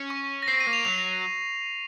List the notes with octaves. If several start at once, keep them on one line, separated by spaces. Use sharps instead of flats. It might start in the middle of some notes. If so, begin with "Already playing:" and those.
Already playing: C#4
C#6
A#6
C4 C7
D#7
A#3
F7
F#3 F7